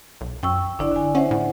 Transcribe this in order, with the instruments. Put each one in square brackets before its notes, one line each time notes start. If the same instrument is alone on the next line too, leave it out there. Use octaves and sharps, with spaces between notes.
[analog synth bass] B1
[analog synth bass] F#2 [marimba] G5 C#6 E6
[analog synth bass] G1 [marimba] D4 E4 D5
[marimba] D3 G#5
[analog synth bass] C#4 [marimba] C5 E5 F#5
[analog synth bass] A2